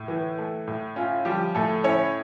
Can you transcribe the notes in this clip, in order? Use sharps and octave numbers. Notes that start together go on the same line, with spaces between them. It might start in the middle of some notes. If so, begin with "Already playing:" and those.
Already playing: A2
E3
A3
A2
C#4 F4
F3 G3 G4
A2 A3 A4
C#4 E4 C#5